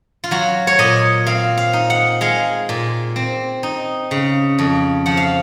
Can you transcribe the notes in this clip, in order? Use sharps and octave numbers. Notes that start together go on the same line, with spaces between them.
F4
F#3 F#4
C#5
A#2 D#5
C4 F5
F5
D#4
F#5
G#3 F5
A#2
C4
D#4
C#3
F2
F3 F#5
F5